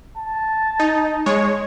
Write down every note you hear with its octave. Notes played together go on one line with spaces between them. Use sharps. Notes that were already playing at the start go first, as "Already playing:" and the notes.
A5
D#4
G#3 C#5